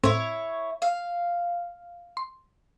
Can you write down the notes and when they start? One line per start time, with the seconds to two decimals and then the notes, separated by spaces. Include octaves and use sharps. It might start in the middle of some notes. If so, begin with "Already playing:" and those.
0.04 A2 C4 E4 C#5
0.82 F5
2.17 C6